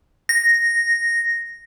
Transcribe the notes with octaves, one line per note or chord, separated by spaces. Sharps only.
A#6